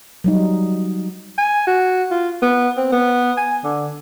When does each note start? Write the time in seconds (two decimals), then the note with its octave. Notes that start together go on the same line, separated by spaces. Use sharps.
0.24 F#3 G3 D#4
1.38 G#5
1.67 F#4
2.11 F4
2.42 B3
2.77 C4
2.92 B3
3.37 G#5
3.64 D3